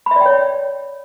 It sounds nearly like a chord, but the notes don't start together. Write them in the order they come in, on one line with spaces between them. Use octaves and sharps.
B5 E5 D5 G5 C#5